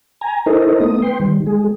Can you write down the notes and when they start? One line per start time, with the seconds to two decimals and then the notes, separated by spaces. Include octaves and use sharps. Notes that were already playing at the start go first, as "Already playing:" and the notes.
0.21 G#5 A#5
0.46 D#4 E4 A4 A#4 C5 D#5
0.80 A3 B3 D#6
1.02 B4 G5 C6
1.20 D#3 G3
1.46 G#3 G#4